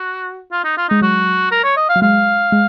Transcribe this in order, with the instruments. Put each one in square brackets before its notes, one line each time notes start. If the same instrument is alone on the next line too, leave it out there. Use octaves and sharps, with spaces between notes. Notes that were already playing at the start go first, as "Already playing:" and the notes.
Already playing: [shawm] F#4
F4
D#4
F4
[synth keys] G#3 [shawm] D#4
[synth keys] F#3 [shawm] F#4
[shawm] A#4
C#5
D#5
F5
[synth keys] F#3
[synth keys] G#3 [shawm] F5
[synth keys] G#3